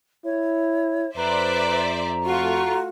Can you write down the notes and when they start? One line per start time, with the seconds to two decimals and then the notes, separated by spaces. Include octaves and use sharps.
0.25 E4 C#5
1.17 F2 B4 C5 D5 E5 A#5
2.25 A3 F4 F#4 C#6